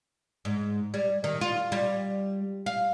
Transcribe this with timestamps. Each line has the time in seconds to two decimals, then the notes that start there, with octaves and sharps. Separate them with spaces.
0.45 G#2
0.94 G3
1.24 D#3
1.41 F4
1.72 G3
2.66 F5